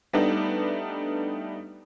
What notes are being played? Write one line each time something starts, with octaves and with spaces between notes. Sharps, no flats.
G3 A3 B3 D4 D#4